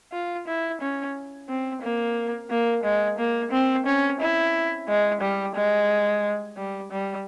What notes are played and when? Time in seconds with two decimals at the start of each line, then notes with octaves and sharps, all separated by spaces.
0.13 F4
0.47 E4
0.81 C#4
1.49 C4
1.82 A#3
2.50 A#3
2.84 G#3
3.19 A#3
3.52 C4
3.87 C#4
4.21 E4
4.89 G#3
5.22 G3
5.55 G#3
6.57 G3
6.92 G3